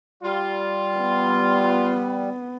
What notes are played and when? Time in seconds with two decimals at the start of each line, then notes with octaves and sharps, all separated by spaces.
0.23 G3 F4
0.98 B3